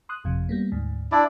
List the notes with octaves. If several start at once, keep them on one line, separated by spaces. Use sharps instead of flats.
C6 D#6 F#6
G1 F2 C3
G3 A#3 B3
D2 G#2
D4 E4 D5